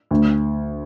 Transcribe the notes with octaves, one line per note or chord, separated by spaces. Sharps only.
D2